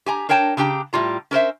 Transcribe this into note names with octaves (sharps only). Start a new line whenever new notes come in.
G4 G#5 A#5
D4 A#4 C#5 G5 A5
C#3 D4 G4 G5 A#5
A2 G3 F4 A#5
C#4 A#4 C5 E5